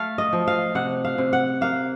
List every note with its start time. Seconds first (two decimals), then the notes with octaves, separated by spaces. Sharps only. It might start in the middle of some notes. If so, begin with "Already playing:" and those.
Already playing: A3 F5
0.18 D#5
0.33 F3
0.48 F5
0.75 C3 F#5
1.05 F5
1.18 C3
1.33 F#5
1.61 A#3 F5